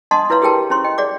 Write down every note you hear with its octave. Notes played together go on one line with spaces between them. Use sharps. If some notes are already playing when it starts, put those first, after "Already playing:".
D4 D#5 F#5 A5 C6 D#6
E4 B4 C#5 F5 C6
G4 G#4 A#4 G5 A5
C#4 E4 C5 C6 C#6
D#5 G5
G#4 D5 F#5 D6